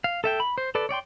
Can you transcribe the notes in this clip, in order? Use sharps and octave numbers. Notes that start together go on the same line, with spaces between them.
F5
A4 E5 G5
B5
C5
A4 B4 D5
C#5 D5 G5 C6